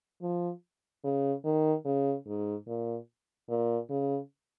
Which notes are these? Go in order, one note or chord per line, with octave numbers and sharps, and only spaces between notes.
F3
C#3
D#3
C#3
G#2
A#2
A#2
C#3